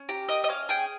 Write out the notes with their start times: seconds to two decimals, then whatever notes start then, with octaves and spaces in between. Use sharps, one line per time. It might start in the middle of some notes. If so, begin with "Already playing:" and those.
Already playing: C#4
0.09 G4 A#5
0.28 A#3 D#5
0.44 D#5
0.49 C#4 F5
0.69 G#4 G5